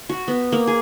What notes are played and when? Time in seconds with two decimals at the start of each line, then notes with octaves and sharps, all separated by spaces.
0.09 F#4
0.28 B3
0.52 A#3
0.67 G#4